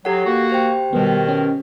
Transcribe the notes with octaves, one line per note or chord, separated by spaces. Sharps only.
F#3 G4 A4 F#5
A#3 F#4
G4 C5 G5
B2 D#3 G3 B3
C#4